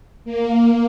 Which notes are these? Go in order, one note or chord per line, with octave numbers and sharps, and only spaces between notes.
A#3